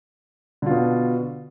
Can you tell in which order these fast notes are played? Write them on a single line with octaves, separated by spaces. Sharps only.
D3 F4 B2